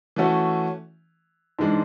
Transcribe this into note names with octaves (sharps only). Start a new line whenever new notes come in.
E3 A3 C#4 F#4
G#2 E3 G#3 D4